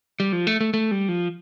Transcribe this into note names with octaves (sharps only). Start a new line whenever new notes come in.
G3
F3
A3
A3
A3
G3
F3